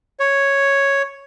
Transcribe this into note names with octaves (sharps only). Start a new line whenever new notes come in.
C#5